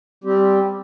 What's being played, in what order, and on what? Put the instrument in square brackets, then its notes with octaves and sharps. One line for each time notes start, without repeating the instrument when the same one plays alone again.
[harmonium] G3 C4 G4